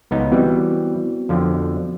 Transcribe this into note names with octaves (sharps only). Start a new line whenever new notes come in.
C#2 B3 D#4
E3 G3 B3 C4 F#4
F2 D3 F3